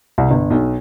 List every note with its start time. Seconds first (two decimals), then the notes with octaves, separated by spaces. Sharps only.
0.18 C2
0.31 G1
0.50 B1